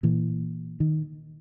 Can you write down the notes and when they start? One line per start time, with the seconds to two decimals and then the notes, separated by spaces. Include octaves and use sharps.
0.03 A#2 E3
0.80 D#3